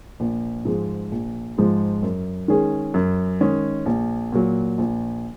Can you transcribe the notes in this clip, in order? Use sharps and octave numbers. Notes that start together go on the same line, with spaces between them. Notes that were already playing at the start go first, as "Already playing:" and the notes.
A#1
G#2 F3 G#3
A#1
G#2 F3 G#3
F#2
D#3 G#3 C#4 G#4
F#2
D#3 G#3 C#4 G#4
A#1
A#2 F#3
A#1